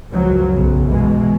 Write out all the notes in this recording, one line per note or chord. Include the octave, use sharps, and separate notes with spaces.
C#2 F#2 F3 F#3
B1 C#3
B2 E3 G#3